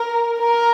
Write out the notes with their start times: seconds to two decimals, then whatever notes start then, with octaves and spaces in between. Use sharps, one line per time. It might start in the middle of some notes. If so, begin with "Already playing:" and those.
Already playing: A#4
0.40 A#4